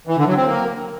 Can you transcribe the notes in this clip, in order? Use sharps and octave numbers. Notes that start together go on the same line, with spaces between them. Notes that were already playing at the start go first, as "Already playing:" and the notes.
E3
D3
F#3
C4
A#3